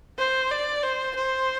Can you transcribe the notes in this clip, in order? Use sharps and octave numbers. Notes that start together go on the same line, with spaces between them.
C5
D5
C5
C5